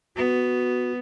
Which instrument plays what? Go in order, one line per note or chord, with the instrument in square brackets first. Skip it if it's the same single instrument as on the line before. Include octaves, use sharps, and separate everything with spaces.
[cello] B3 [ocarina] F#4